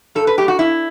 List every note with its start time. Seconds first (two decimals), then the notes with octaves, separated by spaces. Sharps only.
0.15 G2 A4
0.27 B4
0.37 F#3 A3 G4
0.48 F#4
0.59 G2 E4